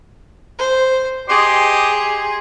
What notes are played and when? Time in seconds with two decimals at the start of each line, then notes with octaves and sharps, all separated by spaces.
0.58 C5
1.29 G4 G#4 D#5 C6